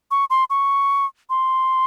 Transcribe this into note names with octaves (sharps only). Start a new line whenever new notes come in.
C#6
C6
C#6
C6